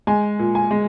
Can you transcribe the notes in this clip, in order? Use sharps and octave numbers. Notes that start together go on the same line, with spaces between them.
G#3 G#5
A#2
G#5
G#3